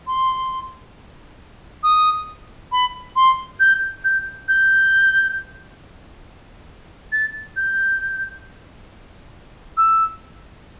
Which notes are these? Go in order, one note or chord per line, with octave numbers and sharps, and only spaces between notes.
C6
D#6
B5
C6
G6
G6
G6
A6
G6
E6